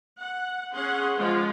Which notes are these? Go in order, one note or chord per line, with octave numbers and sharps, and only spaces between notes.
F#5
C#4 G#4 F#5 C6
F3 G#3 F4